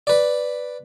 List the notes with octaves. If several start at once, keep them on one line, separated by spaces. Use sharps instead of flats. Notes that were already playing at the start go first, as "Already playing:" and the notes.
B4 D5